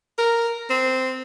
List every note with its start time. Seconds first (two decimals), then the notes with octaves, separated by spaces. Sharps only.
0.18 A#4
0.70 C4